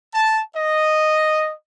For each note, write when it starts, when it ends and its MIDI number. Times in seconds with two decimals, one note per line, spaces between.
0.14 0.40 81
0.55 1.51 75